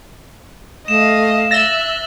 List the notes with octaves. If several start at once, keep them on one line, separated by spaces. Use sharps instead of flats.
A3 D#5 F5 E7
E5 F#6 A6 A#6 E7 G7